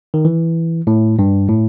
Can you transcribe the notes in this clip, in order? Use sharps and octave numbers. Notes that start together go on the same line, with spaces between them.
D#3
E3
A2
G2
A2